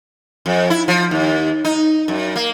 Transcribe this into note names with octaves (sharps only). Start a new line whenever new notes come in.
F2
E4
F3
D#2
D#4
F#2
A#3